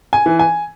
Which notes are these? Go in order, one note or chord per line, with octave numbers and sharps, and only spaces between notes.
G#5
E3
G#5